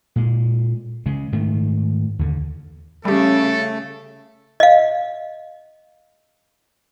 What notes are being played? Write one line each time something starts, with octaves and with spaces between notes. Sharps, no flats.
A#2 G#3
C#3 G#3
G#2 D#3 A3
D#2 D3
C#3 G3 A3 G4 A4
D#5 F5